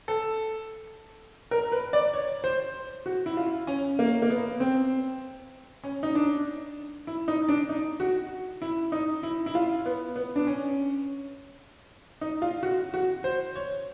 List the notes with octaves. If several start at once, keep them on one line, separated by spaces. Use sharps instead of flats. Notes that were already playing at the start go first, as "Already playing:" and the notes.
A4
A#4
B4
D5
C#5
C5
F#4
E4
F4
C#4
A#3
A#3
B3
C4
C#4
D#4
D4
E4
D#4
D4
D#4
F#4
E4
D#4
E4
E4
F4
B3
B3
D4
C#4
D#4
F4
F#4
F#4
C5
C#5